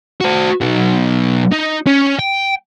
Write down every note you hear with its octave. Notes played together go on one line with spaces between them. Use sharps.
F#4 C5
B2 F#3
D#4
C#4
G5